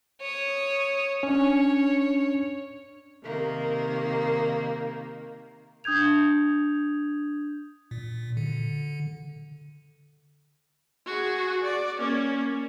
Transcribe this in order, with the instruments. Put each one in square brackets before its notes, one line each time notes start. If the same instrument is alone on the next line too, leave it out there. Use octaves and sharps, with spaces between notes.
[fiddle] C#5 D#6
[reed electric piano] C#4 D4 [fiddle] C#5
[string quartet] C3 D#3 A#3
[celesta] D4 D#6 G6 G#6 F7
[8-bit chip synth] A#2
D3
[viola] F#4 G#4
D5
A#3 C#4